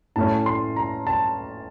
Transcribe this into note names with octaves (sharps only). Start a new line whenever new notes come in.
A2 A3 C#4 A5
C6
A#5
A5